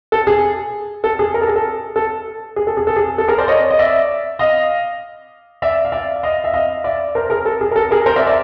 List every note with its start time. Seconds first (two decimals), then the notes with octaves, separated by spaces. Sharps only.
0.12 A4
0.27 G#4
1.04 A4
1.19 G#4
1.34 A#4
1.41 A4
1.48 G#4
1.56 A4
1.96 A4
2.56 G#4
2.67 A4
2.77 G#4
2.87 A4
2.96 G#4
3.18 A4
3.28 G#4 A#4
3.38 C5 D5
3.48 C#5 D#5
3.70 D#5
3.79 D5 E5
4.39 D#5 F5
5.62 D5 E5
5.85 F5
5.92 D5 E5
6.23 D#5 F5
6.44 E5
6.54 D#5 F5
6.84 D5 E5
7.15 A#4 C5
7.30 G#4 A#4
7.45 A4
7.61 G#4
7.71 A#4
7.76 A4
7.91 G#4 A#4
8.06 A#4 C5
8.16 D5 E5
8.27 D5 E5